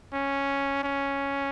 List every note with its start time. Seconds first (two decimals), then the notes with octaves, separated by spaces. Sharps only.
0.13 C#4
0.83 C#4